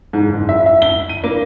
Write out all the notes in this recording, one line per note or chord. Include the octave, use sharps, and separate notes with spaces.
G#2
F#1
E5
E5
G7
D#7
A#3